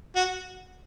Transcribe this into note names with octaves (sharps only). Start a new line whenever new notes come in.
F#4